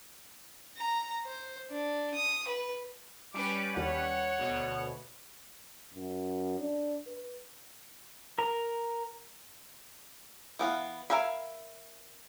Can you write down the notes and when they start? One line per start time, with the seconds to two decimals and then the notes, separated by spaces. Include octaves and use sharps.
0.77 A#5
1.25 C5
1.70 D4
2.14 D#6
2.48 B4
3.34 G3 C#4 B4 D6
3.77 D#2 C#5 F#5
4.39 D2 B2
5.94 F#2
6.59 D4
7.07 B4
8.38 A#4 A#5
10.59 E3 B3 F5
11.10 A#4 E5 F5 G#5 B5